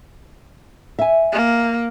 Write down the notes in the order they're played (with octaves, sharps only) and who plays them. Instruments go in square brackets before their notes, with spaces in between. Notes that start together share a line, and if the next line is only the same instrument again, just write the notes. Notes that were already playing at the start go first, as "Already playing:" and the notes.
[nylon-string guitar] E5 G#5
[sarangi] A#3